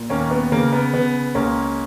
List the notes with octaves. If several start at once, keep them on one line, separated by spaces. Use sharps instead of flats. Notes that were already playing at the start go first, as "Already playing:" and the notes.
Already playing: A#2
D#2 A#3 C#4
B3
C#3 A#3
B3
C#3 B3
C#2 A#3 C#4